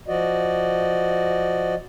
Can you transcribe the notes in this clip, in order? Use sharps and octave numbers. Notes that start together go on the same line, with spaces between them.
F3 F#4 D5 D#5